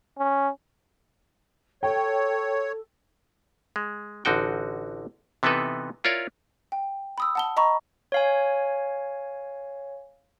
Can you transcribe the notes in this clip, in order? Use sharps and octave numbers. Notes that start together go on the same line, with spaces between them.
C#4
A4 C#5 G5
G#3
A1 D3 D#4 F#4 G5
C3 E3 B3 D#4 A4 B4
E4 F4 A#4 C#5 D5
G5
B5 D#6 E6
F#5 A5 G7
D#5 A#5 B5 C#6
C#5 F5 G#5